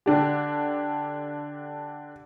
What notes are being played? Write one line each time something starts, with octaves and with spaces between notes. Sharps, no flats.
D3 D4 G4